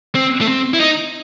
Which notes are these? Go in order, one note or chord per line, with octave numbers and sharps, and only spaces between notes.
C4
A3
C4
E4
D#4